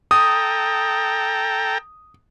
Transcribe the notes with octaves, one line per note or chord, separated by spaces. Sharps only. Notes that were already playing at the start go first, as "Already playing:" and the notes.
A4 G5 A#5 D#6